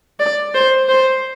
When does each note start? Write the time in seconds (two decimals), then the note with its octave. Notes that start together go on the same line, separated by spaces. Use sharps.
0.20 D5
0.55 C5
0.89 C5